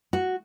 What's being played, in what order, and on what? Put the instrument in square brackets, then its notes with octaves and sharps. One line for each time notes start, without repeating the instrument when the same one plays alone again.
[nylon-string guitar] F#4